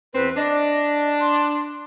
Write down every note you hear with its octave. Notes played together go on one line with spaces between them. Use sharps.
E2 C4 B4
D4 D#5
C6